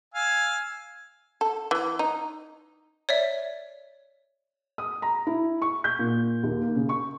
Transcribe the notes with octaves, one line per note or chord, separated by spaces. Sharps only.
F5 G#5 E6
A4
E3
D#4
C#5 D5 E5
D#6
A#5
E4
C#6
G6
A#2
D#2
A#3
C#3
C#6